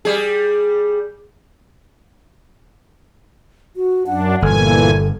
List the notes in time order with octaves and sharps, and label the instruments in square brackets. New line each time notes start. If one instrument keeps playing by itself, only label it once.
[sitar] G3 G#4
[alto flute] F#4
[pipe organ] F#2 D4 [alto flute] F#5
[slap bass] G1 [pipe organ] A#2 E3 G#5 [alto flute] A4